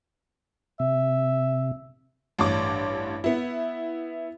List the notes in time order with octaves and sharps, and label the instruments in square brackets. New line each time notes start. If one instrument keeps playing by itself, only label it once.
[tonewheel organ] C3 [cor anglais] E5
[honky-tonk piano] A1 G2 D6
B3 E4